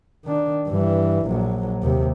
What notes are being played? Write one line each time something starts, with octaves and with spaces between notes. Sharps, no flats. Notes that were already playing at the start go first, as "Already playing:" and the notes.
D#3 D4
G2 E3
A#1 F#3
D#2 C3